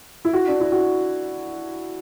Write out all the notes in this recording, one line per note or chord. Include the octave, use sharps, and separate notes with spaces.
E4
F#4
D4
E4
F#4